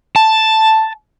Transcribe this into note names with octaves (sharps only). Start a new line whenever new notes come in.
A5